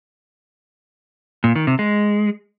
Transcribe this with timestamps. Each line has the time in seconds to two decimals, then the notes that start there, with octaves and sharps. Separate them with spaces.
1.44 A#2
1.56 D#3
1.67 C3
1.79 G#3